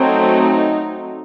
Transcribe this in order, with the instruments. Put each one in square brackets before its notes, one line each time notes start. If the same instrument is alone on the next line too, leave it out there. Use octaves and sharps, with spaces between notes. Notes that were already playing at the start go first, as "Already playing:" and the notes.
Already playing: [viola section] F#3 A3 C4 D#4